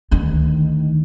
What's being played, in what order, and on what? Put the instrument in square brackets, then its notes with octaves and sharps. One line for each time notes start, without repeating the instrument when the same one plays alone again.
[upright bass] D2 D#3